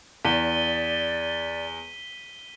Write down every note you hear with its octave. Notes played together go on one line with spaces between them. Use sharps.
E2 D5 B6 D#7 G7